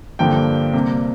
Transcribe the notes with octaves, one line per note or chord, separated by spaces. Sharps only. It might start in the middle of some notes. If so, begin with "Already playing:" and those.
G2 D3 F3 A#3 G5
C3 G3 A#3